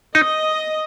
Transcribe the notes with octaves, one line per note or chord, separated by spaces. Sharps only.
D#4 D#5